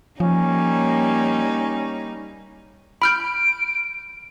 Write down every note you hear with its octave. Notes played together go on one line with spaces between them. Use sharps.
F3 G3 A#3 C#4 D#4
B5 F6 G6 D7